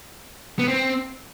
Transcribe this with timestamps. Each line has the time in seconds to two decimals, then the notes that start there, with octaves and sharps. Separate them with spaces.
0.59 B3
0.68 C4